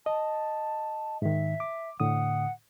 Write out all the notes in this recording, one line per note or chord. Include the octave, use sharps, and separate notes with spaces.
D#5 A5
G#2 D#3 E5
D6
A2 D3 F#5 D#6